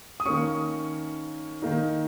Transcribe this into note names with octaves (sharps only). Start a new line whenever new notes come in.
D#6
D#3 A#3 C#4 C#6
D#3 A#3 D#4